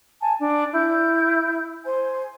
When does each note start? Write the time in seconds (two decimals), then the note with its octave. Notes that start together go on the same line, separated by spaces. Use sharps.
0.21 G#5 A5
0.40 D4
0.73 E4 G6
1.85 C5 G#5